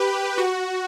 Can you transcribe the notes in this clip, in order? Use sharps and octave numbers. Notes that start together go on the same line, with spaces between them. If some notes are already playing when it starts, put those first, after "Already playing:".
Already playing: G4 B4
F#4